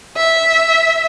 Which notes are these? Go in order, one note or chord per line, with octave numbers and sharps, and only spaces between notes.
E5